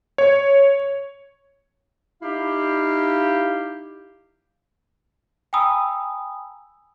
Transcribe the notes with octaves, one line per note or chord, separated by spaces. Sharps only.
C#5
D#4 E4 G4 F5
G5 G#5 A#5 B5 D#6 E6